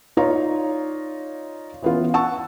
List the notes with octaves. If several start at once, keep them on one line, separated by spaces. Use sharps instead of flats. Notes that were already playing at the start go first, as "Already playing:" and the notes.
D#4 F4 C#5 D5 A#5
E3 B3 C#4 F4
F#5 A5 C#6 E6